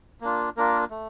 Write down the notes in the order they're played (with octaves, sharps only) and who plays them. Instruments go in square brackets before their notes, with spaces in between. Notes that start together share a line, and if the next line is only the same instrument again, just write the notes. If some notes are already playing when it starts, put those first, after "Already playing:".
[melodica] A#3 D4 F4
A#3 D4 F4 A#4
A3